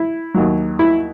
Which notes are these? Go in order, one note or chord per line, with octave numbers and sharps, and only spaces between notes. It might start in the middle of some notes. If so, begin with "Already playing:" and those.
Already playing: E4
D#2 D#3 F#3
E4